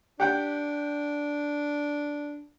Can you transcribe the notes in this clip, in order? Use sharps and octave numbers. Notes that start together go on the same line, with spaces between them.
D4 G4 F#5 G5